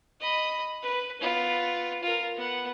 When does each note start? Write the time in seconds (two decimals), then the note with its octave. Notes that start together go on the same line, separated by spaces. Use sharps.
0.20 D#5 B5
0.82 B4
1.21 B3 F4
2.03 F4 A#4
2.36 B3 F#5